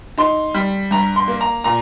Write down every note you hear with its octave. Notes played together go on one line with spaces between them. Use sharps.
D#4 C6
G3
G2 A#5
C6
A#3
A#5
A#2 A#5